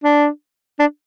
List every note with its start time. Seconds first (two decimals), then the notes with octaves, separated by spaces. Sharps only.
0.04 D4
0.80 D4